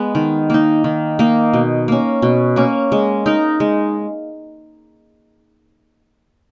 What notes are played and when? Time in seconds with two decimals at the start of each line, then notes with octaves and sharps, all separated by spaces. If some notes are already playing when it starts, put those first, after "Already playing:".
Already playing: G#3 B3
0.15 D#3
0.50 A#3 D#4
0.84 D#3
1.19 A#3 D#4
1.53 B2
1.88 A#3 C#4
2.22 B2
2.56 A#3 C#4
2.92 G#3
3.26 D#4 A#4
3.60 G#3